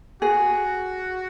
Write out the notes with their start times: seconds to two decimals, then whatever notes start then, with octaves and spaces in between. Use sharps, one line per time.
0.22 F#4 G#4